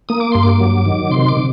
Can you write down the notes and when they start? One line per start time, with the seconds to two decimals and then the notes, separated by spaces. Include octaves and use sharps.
0.09 A#3 D#6
0.20 D6
0.32 G2 C6
0.43 D6
0.60 F#3
0.85 D#3
1.11 C3 C6
1.28 D6
1.37 C3